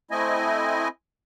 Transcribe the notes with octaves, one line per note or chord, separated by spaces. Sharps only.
A3 C4 E4 D#5 G#5